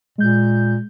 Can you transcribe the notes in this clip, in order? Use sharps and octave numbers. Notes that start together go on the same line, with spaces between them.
A#2 G#3 G6